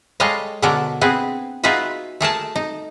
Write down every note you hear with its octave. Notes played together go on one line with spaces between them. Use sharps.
G3 G#3 A4 C#5 D#5 F5
B2 D3 C#4 D4 A4 A#4
B3 C4 G#4 B4
D#4 F4 F#4 G#4 B4 E5
A3 G#4 A#4 A5
D#4